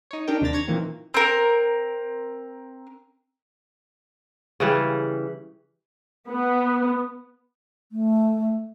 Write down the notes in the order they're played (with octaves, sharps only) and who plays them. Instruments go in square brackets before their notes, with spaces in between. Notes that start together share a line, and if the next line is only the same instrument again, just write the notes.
[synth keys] D#4 C#5
D4 D#4 G4 A#4 G5
D#2 C3 D4 A#5 A6 B6
A#5 C#6 G#6 A6
A#2 D#3 E3 A#3 C4
[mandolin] C4 A#4
[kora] C#3 E3 G3
[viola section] B3
[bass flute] A3